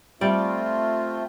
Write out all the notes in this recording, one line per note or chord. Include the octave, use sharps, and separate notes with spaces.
G3 A3 C4 F4 D5